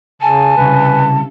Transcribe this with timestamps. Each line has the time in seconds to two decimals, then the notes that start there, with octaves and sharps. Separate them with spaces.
0.22 C#3 G#5 A5
0.58 C2 C#3 B4